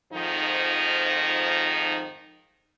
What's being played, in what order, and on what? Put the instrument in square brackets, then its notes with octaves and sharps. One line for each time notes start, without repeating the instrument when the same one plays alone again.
[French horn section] F2 G#2 D#3 F3 D#4